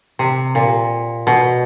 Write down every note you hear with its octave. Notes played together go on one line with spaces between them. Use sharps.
C3
A#2
B2